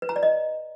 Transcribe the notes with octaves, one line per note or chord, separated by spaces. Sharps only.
B4
A#5
D5
D#5